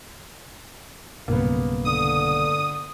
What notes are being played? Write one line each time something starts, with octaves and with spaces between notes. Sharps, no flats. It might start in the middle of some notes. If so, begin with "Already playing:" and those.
B1 G2 C#3 A#3 B3
D3 D#6